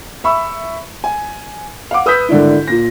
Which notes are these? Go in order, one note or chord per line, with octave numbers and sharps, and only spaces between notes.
E5 B5 C#6 E6
G#5
F5 F#5 D6
B4 D#6 E6 G6 B6
G#1 D3 D4 E4
A#2 A#6